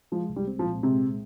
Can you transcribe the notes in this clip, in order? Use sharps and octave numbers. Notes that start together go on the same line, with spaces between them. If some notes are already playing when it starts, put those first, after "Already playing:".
F3 G#3
C2
G3
C4
F3
A#2
C3 G#3